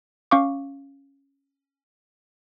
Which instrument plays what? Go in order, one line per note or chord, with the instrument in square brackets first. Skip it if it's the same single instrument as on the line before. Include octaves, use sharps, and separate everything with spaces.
[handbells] C#4 F5 C#6 D6